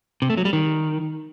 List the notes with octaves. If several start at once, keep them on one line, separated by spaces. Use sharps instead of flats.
C3
A3
F#3
G3
D#3